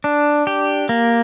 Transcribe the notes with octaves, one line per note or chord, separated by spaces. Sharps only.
D4
G4
A#3